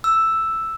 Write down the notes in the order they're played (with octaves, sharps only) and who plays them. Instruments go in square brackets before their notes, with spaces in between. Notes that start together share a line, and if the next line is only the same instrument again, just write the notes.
[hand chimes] E6